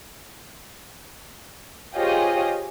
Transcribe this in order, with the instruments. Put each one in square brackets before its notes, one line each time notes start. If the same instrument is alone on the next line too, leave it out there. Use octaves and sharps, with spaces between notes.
[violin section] F4 G4 G#4 C5 C#5 D#5